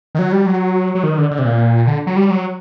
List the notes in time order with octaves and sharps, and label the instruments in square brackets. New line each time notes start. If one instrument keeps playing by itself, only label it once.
[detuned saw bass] D#3
F#3
G3
F#3
F#3
D#3
D3
D3
C3
A#2
D3
F#3
G3
F#3